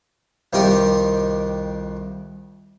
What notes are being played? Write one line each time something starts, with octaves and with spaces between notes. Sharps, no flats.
C2 F2 D#3 F4 G4 A#4